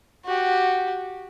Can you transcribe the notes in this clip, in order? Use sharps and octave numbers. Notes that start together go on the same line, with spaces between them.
F#4 G4